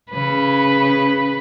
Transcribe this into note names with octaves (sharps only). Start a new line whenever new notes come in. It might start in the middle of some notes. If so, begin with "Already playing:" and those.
C#3 B4